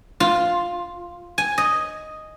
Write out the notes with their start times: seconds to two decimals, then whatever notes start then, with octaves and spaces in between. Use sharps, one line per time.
0.20 F4
1.38 G#5
1.58 D#5